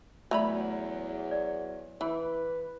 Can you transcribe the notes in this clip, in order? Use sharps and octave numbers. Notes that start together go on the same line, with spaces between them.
E2 F#3 A3 D5 E5 A#5 B5
D5
E3 B4